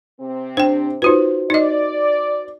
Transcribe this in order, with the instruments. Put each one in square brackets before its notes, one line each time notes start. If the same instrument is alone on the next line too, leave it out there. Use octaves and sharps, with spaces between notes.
[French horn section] C3 C4
[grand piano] D4 [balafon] C5 G5
[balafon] D#4 F4 B4 [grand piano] F#4 C5
[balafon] D#4 D#5 [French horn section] D5